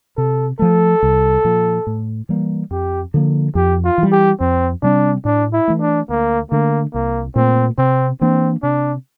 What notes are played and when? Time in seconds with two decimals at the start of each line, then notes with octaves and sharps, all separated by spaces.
0.17 C3 A4
0.59 F3 A3 A4
1.03 C2
1.45 A#2 F3
1.87 A2
2.29 E3 G3 A#3
2.71 F2 G4
3.14 D3 F3 A#3
3.55 F2 G4
3.84 F4
3.98 E3
4.03 G3
4.12 G4
4.40 F2 C4
4.82 C3 G3 C4 D4
5.25 A2 D4
5.53 E4
5.68 E3 A3
5.81 D4
6.09 D2 A#3
6.51 D3 A3 A#3 D4
6.94 C2 A#3
7.36 A#2 A3 C4
7.78 C3 C4
8.21 E3 A#3 C4 D4
8.63 C3 D4